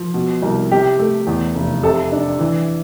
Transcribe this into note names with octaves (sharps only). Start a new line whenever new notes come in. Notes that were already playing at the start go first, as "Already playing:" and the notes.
Already playing: F3
B2
C2
C3 G4
A3
E2
F1
C3 A4
D4
E3